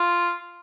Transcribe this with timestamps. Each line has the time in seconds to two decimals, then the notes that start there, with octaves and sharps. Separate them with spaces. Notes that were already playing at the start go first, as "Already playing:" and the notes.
Already playing: F4